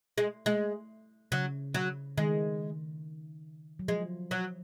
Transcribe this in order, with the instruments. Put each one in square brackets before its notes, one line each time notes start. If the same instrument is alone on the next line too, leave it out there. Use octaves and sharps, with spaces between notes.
[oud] G#3
G#3
[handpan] C#3 [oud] F#3
[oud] F#3
[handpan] D#3 [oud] G#3
[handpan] F#3
[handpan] F3 [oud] G#3
[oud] F#3